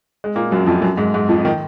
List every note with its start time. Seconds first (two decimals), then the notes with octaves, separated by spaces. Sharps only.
0.24 G#3
0.36 A#2 A#3
0.51 F#2 F#3
0.66 F2 F3
0.82 F#2 F#3
0.97 G#2 G#3
1.14 G#2 G#3
1.29 F2 F3
1.45 D#3